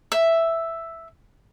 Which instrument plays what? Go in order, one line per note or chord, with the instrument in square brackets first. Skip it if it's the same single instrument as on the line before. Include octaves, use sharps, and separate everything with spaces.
[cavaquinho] E5